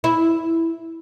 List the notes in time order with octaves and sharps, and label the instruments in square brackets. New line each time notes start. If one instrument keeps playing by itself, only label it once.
[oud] E4